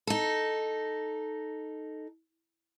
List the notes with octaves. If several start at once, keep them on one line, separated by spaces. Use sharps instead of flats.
D#4 A4